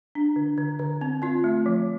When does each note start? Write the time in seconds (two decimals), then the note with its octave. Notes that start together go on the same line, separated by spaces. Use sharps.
0.15 D4
0.36 D3
0.58 D3
0.79 D3
1.01 C4
1.22 C4 F4
1.44 A3
1.66 F3